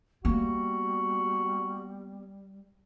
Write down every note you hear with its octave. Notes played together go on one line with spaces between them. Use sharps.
G3 A#3 B3 F#4